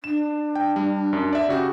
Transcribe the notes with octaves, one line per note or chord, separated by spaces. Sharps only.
D4 E7
G5
G3
F#2
D5 E5
C#3 F#4 G4